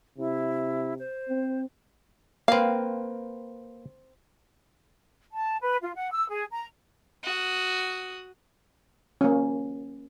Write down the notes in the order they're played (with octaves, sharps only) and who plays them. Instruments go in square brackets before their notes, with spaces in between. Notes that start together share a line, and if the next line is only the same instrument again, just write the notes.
[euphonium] C3 [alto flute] E4
[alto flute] C5
[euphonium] C4
[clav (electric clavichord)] A#3 B4 [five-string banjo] C4 F5
[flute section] A5
B4
F4
F#5
E6
G#4
A#5
[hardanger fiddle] F#4 D#6
[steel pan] A#3 C#4